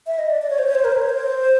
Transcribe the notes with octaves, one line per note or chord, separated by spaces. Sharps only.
E5
D#5
D5
D5
C#5
C5
C#5
C5
A#4
C5
C#5
C5